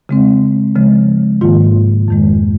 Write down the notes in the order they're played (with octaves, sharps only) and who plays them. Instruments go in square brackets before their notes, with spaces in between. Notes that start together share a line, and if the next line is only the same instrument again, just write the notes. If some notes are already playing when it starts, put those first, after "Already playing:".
[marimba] C#3 G#3 C4
C#3 F3 G#3
G#2 D#3 A#3 F4
F2 D#3 G#3